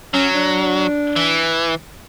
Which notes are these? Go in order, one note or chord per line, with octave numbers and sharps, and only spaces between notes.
F#3 C#4
D4
E3